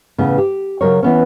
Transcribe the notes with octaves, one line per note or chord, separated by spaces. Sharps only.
E2 A2 C#3 B3
G4
C#3 F#3 A#4 C#5
E3 B3 C#4